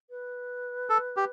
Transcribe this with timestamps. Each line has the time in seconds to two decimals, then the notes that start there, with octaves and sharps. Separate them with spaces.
0.10 B4
0.90 A4
1.17 G4